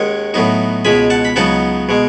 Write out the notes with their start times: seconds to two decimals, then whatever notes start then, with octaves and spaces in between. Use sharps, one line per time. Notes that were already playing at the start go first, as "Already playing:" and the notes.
Already playing: D#2 D#3 G#3 C#4 F#5
0.34 A2 F#3 B3 D#4
0.85 C#2 B2 G#3 G#5 B5
1.10 F#5 A5
1.25 B5
1.36 C#2 C#3 F#3 B3 D#4 F#5 A5
1.89 B2 G#3